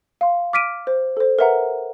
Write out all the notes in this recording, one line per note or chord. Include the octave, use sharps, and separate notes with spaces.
F5 C6
D6 F6 B6 D7 D#7
C5
A4 C5
A#4 B4 E5 F#5 A#5